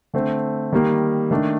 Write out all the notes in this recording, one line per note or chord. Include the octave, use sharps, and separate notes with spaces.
D3 A3 C4
D#3 G3 A#3
D#3 A3 D4